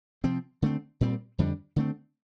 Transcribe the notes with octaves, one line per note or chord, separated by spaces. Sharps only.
C3 F3 C4
D3 A3 C4
A#2 G3 C4
F2 D3 G3 D4
D3 A3 C4